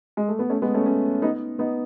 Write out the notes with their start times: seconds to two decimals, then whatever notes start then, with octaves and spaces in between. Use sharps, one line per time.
0.17 G#3
0.28 A3
0.39 B3
0.50 A3 C#4
0.62 G#3 B3
0.74 A3 C#4
0.86 A3 C#4
1.22 B3 D#4
1.59 B3 D#4